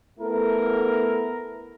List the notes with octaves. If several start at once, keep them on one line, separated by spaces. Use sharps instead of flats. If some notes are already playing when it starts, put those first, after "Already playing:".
A3 B3 E4 A4 A#4